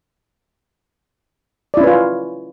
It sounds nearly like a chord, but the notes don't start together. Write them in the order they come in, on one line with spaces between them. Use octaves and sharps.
D5 E4 C#4 B4 F4